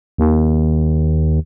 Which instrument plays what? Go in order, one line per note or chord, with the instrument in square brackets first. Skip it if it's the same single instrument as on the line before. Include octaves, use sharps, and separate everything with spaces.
[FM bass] D#2